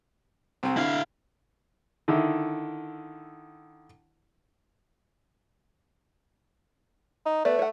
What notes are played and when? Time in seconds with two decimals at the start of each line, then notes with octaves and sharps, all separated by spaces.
0.63 C2 C4
0.77 D3 E4 F5
2.08 D3 D#3 E4
7.26 D#4
7.45 A3 B3 D5
7.59 C#5 F#5